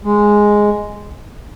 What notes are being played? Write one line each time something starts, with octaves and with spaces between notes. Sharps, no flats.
G#3